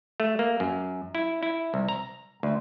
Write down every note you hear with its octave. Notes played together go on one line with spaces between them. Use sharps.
A3
A#3
F#2
E4
E4
C2
A#5
D2